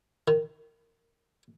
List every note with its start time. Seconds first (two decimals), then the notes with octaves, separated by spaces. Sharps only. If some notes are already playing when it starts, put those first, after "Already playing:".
0.28 D#3